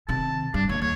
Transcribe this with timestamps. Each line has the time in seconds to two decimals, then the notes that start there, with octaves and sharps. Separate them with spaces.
0.09 C3 D#3 A5
0.54 G2 D4
0.69 D#2 E3 C#5
0.82 D#2 C#5